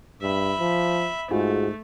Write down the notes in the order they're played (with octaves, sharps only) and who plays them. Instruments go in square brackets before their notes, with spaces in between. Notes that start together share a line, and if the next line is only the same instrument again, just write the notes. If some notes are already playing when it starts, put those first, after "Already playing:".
[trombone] G2 [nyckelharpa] E5 B5
[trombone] F3
[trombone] G#2 [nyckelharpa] A3 [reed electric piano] F4 F#4 G#4